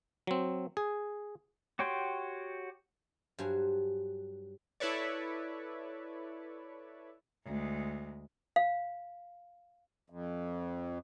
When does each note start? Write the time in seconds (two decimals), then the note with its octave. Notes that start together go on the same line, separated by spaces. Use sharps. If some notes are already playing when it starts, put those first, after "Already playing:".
0.27 F#3 C4
0.77 G#4
1.79 F#4 G4 C#5 G5 C6
3.39 G2 F#3 C5 G#5
4.80 E4 A4 B4 C#5 D5
7.44 D2 G#3
8.56 F5
10.10 F2